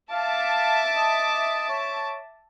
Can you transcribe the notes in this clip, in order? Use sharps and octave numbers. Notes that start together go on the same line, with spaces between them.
E5 F5 A5 D6
D#5
C#5